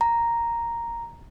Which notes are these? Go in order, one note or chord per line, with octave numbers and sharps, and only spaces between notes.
A#5